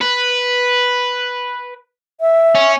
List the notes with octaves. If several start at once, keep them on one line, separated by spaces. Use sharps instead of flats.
B4
E5
C#4